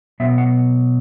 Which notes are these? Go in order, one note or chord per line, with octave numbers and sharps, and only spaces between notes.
B2 F#3 B3 E5
F#5